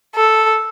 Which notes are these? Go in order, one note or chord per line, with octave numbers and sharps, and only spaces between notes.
A4